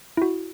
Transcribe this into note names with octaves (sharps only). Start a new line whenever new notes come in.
E4
F#4